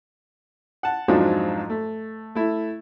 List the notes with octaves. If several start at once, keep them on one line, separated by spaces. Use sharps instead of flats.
F#5 A5
F2 G#2 F3 F#3 D4
A3
A3 E4